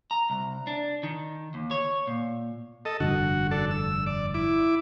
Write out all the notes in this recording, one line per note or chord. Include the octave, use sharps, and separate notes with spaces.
A#5
C2
D4
D#3
D#2
C#5
A#2
A4 D#5
F1 G2 D3 F#4
D4 A4
E6
D5
E4 D6